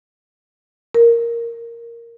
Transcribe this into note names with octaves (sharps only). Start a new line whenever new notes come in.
A#4